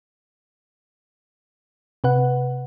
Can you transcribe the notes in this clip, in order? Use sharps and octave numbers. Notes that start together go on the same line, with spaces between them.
C3 B4 F#5